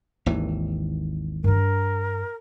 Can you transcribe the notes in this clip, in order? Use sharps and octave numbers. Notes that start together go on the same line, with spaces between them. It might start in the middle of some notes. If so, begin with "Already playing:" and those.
G#1 D#2 E3
G2 D4 A#4